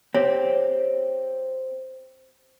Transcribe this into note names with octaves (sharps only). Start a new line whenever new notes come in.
C4 G4 C#5